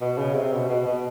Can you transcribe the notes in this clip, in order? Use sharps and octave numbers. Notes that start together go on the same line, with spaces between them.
B2
C#3
C3
B2
B2
B2